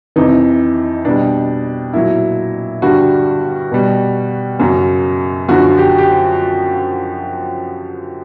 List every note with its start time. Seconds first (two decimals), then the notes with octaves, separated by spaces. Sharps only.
0.16 F2 C3 E3 D#4
1.05 B2 G3 D4
1.93 A#2 F#3 E4
2.82 G2 D3 G3 F#4
3.71 B2 G3
4.59 F#2 C#3 F#3
5.48 F#2 D3 F3 F#4
5.78 G4
5.98 G4